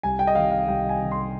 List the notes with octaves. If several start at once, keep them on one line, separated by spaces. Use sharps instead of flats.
C2 G#5
G5
D#5
C3 D#3 F5
F5
C2 G5
G#5
C3 D#3
C6